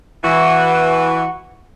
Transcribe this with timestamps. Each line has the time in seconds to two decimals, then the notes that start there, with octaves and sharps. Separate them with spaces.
0.24 E3 F#4